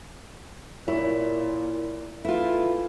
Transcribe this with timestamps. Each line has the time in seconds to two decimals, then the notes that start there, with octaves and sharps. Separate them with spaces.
0.88 A#2 E4 C#5
2.25 E3 A3 E4 F4